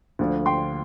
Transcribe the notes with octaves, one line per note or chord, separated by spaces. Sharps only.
D2 D3 F3
G5 C6